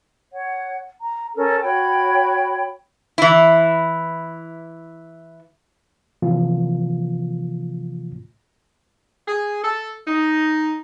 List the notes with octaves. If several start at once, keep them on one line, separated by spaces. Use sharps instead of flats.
C#5 F#5
A#5
C#4 A4 A#4
F#4 C#5 G5 B5
E3 E4
C3 E3 F3 A#3 F4
G#4
A4
D#4